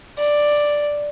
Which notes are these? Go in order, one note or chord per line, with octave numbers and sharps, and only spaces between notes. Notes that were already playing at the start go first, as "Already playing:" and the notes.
D5